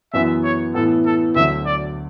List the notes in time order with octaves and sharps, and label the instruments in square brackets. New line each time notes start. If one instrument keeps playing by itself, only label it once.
[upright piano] F#2 E3 B3 F#4 [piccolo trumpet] E5
[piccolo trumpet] C#5
[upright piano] A2 E3 B3 [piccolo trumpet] A4
[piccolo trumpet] A4
[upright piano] D2 D3 F#3 [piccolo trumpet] E5
[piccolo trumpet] D5